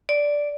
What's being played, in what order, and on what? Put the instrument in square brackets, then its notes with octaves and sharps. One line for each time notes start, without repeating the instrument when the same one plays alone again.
[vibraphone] D5